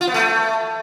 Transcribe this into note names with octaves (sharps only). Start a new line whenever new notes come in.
F4
B3
A3